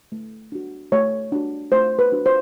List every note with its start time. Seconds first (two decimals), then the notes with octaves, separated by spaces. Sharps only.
0.12 A3
0.52 D4 F#4
0.92 A3 C#5
1.32 D4 F#4
1.72 A3 C5
1.99 B4
2.12 D4 F#4
2.26 C5